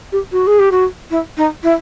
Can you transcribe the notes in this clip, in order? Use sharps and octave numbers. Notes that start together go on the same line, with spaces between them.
G4
F#4
G#4
G4
F#4
E4
D#4
E4